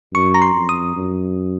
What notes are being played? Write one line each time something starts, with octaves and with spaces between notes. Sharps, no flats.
F#2 C#6
A#5
C6
F2
D#6
F#2